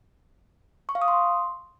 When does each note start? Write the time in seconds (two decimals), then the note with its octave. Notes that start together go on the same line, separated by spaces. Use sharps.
0.89 C#6
0.95 F5
1.02 D#6
1.08 C6